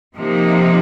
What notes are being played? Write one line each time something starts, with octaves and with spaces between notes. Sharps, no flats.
C3 F3 A#3 D#4